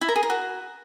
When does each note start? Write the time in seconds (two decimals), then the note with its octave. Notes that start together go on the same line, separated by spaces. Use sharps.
0.01 E4
0.08 A#4
0.16 G#4
0.23 A#4
0.30 F#4